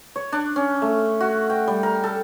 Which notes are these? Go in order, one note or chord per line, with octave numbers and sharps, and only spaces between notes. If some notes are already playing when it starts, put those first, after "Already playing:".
C#5
D4
C#4
A3
F#4
G5
G3
A#4
A4